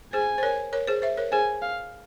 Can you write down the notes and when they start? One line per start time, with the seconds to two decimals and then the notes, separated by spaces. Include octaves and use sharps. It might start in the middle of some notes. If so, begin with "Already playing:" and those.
0.13 G#4 C5 G#5
0.38 C5
0.43 A#4 C#5
0.73 A#4 C#5
0.87 G#4 C5
1.02 C5 E5
1.17 A#4 C#5
1.32 G#4 C5 G#5
1.62 F5